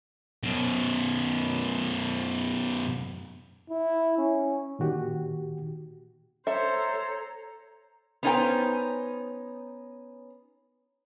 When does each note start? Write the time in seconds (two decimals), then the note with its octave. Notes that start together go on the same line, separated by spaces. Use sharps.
0.43 F#2 B2
3.70 E4
4.18 C#4
4.79 A#2 D#3 F#4 G4
6.47 A4 C5 C#5 E5 A#5
8.23 B3 C#4 D#4 F#4 C5 G5